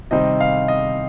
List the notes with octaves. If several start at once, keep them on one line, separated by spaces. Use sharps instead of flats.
C3 D#3 G3 C4 D#4 D#5
F5
D#5